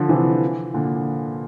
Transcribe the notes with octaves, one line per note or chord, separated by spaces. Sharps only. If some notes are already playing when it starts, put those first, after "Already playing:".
Already playing: D3 F3
C3 E3
A#2 D3